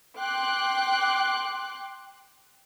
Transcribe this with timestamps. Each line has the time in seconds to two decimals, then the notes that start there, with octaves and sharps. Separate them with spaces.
0.17 G5 C6 D6 F#6